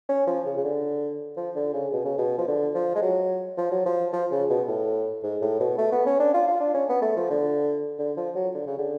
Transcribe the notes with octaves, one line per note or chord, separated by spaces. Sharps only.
C#4
F3
C#3
C#3
D3
F3
D3
C#3
B2
C#3
B2
F3
D3
F3
G#3
F#3
F3
F#3
F3
F3
C#3
B2
A2
G#2
A2
B2
A3
B3
C#4
D4
F4
F4
D4
C#4
B3
A3
F3
D3
D3
F3
F#3
D3
C#3
D3